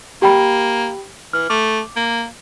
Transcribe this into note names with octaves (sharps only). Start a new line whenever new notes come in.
A#3 G4 G5 B5
E3 F6
A3 D6
A#3